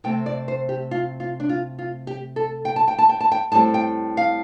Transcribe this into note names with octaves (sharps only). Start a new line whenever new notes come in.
C3 A3 C4 G5
D5
C5
G4
F4
F4
D4
F4
F4
G4
A4
G5
A5
G5
A5
G5
A5
G5
A2 G3 C4 A5
G5
F5